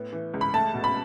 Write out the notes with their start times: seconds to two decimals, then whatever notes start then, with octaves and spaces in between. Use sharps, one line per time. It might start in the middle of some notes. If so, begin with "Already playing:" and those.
Already playing: A2 B3
0.13 E3
0.34 C#2
0.41 B5
0.53 A3 A5
0.74 B2
0.84 B5